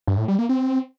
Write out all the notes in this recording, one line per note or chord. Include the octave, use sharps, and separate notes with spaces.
G2
A2
G3
A#3
C4